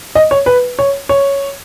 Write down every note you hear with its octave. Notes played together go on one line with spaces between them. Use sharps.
D#5
C#5
B4
C#5
C#5